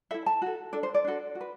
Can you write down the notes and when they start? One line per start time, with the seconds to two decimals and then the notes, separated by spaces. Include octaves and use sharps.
0.11 E4 A4 E5
0.26 A5
0.42 F#4 A4
0.73 D4 A4 D5
0.83 C5
0.94 D5
1.04 D4 F#4 A4
1.35 F#4
1.41 B4